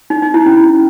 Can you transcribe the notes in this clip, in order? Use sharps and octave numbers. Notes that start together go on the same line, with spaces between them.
D#4
D#4
E4
C#4